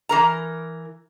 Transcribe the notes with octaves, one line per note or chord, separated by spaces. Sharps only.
E3 A#4 A#5